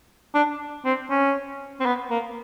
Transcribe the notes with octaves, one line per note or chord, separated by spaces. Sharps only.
D4
C4
C#4
C4
B3
A#3